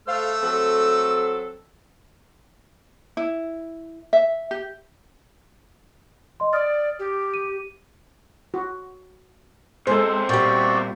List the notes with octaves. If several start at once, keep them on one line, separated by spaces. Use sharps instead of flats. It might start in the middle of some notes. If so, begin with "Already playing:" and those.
A3 A4 C5 F5 E6
F#3 C4 A4
E4
E5
G4
D#5 C6
D5 D#6 F6 A6
G4
D#7
F#4
B2 G#3 C4 A4 C5
A#2 G3 F#4 D5 G5